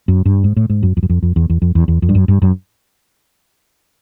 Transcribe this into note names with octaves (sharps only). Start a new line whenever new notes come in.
F#2
G2
G#2
A2
G#2
F#2
F2
F#2
F2
F2
E2
E2
F2
E2
E2
F2
G2
F#2
G2
F#2